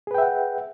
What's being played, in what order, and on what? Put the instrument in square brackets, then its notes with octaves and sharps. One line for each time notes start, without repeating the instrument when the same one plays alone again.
[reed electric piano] G#4
B4
G5
E5
F#5